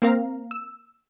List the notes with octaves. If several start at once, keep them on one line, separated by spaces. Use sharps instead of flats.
A#3 C4 A#4 F5 A#5
E6